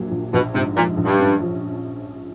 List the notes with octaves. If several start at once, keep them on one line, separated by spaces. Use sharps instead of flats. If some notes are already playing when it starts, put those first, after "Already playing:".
Already playing: A#1 A#2 F#3
A#1
A#1 B2
G#2 C3
A#2 F3
A#1
G2
C#4
F3